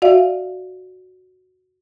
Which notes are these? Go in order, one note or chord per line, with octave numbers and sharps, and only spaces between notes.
F#4 D5 E5 F5